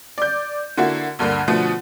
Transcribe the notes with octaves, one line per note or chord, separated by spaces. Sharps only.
D5 G6
D3 A#3 E4 F#4
D2 G2 D3 A#3
B2 D3 F3 A3 B3